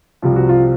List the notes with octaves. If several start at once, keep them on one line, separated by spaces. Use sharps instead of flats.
C2 C3 F3 F4
F#4
F4